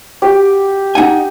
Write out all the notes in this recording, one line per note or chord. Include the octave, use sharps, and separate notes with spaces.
G4
D#4 F#5 G#5